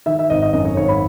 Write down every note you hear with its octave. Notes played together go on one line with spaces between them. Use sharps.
D#3 E5
E5
G#1 D#5
D#5
F#2 D#5
C#5
G#1 C#5
B5